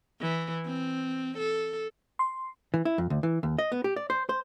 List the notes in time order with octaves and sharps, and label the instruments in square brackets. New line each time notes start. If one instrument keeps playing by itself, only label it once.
[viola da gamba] E3
C4
A4
[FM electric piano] C6
[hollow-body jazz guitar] E3
E4
F2
D2
E3
D#2
D#5
B3
G4
D5
C5
C5